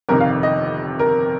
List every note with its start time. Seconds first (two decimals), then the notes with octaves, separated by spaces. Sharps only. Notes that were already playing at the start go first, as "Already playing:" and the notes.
0.09 G1 F2 C3 D#3 A#4
0.20 F5
0.43 D#5
0.99 A#4